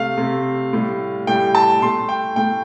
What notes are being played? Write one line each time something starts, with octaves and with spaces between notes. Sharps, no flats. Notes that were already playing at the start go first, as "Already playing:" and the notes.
Already playing: C3 A3 F5
C3 A3
A2 G3
A2 G3 G5
A5
A2 A3 C6
G5
A2 A3 G5